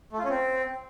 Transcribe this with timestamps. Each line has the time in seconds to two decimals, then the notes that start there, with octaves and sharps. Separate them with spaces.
0.13 A3
0.18 F4
0.24 C#4
0.30 C4